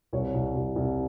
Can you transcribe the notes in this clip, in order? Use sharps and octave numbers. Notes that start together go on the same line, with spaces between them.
C2 C#5
C2
C2
C2